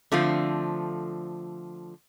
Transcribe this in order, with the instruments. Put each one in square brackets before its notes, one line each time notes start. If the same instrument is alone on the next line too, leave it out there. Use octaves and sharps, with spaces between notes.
[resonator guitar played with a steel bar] D3 F3 A3 C4 F4